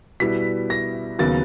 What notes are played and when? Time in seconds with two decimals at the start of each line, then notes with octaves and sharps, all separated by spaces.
0.20 B2 G3 B3 E4 B6
0.70 A#6
1.19 D#2 C#3 F#3 B3 A6